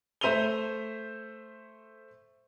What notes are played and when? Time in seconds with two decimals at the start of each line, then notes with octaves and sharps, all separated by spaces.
0.21 A3 C5 E5 D#7 F7 G7